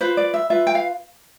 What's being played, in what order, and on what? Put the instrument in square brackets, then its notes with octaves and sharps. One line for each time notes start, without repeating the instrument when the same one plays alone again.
[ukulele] F4 B4 C5
D5
E5
F4 B4 E5
G5
F5